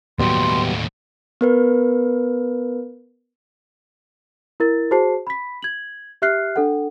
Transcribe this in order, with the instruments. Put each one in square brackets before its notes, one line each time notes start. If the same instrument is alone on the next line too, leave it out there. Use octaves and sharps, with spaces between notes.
[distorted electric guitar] D#2 A2 [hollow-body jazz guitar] F#3 G3 B3 [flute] C6
[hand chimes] B3 A#4 B4
[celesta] E4 A#4 A6
F#4 G#4 C5 A5 C7
B5 B6
G#6 F#7
G4 E5 F6 F#6 C7
D4 A4 F#5